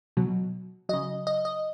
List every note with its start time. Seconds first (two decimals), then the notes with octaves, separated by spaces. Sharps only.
0.17 B2 F#3
0.89 C#3 F#3 D#5
1.27 D#5
1.45 D#5